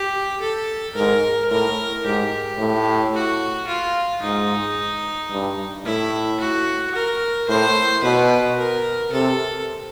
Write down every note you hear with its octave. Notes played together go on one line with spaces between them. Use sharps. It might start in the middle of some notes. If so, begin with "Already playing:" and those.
Already playing: G4
A4
G#2 A#4
A2 A#4
G#2 G4
A2
F#4
F4
G#2 D#4
G2
A2 E4
F#4
A#4
A2 C5
B2 B4
A#4
C3 A4